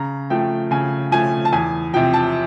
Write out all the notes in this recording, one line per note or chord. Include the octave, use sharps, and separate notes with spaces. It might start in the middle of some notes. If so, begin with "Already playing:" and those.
Already playing: C#3 A#5
F3 A3 G5
C#3 G#5
F3 A3 G#5
A5
E2 G#5
C3 F3 G5
A5